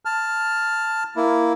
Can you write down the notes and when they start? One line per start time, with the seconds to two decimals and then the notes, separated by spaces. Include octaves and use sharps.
0.05 A5 F6
1.16 A#3 E4